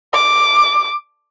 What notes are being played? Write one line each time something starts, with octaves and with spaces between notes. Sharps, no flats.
D6